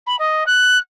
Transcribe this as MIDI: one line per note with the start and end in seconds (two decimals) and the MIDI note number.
0.06 0.16 83
0.19 0.43 75
0.46 0.77 90